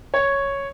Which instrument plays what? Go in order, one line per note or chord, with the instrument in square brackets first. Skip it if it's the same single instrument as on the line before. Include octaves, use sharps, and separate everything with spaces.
[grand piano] C#5